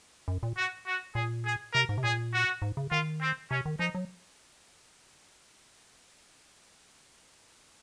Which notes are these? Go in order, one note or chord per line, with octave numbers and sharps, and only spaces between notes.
F#2
A#2
F#4
F#4
A#2 G#4
G#4
C3 A#4
G#2
C3
A#2 G#4
F#4
G#2
C#3
D#3 F4
C4
C3 C#4
D#3
F3 D#4
F#3